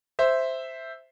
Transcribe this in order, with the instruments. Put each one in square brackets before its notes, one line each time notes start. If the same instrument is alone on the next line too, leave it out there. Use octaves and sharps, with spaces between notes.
[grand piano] C5 E5